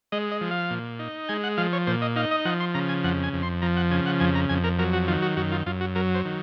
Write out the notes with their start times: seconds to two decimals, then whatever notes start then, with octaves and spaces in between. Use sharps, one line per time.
0.12 G#3 D#5
0.32 D#5
0.41 F3
0.51 F5
0.71 A#2
0.99 D#4
1.29 G#3 G#5
1.44 F#5
1.57 F3 F5
1.73 C#5
1.87 A#2 C5
2.02 D#5
2.16 D#4 F5
2.31 D#5
2.45 F3 F#5
2.60 C6
2.74 C#3 A#5
2.89 G#5
3.04 F2 F#5
3.24 G#5
3.33 F2
3.43 C6
3.62 F3 A#5
3.77 F#5
3.91 C#3 G#5
4.06 F#5
4.20 F2 G#5
4.35 A#5
4.49 F2 G#5
4.64 A#4
4.79 F#3 A#4
4.93 F#4
5.08 D#3 F4
5.22 F#4
5.37 F#2 F#4
5.52 F4
5.66 F#2 F4
5.81 F#4
5.95 F#3 A#4
6.15 C5
6.25 D#3